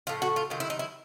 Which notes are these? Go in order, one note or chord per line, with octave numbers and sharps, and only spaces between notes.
A2 F3 A3 F4
F#4
F4
C3 D#3 F#3 F4
E4
D#4
E4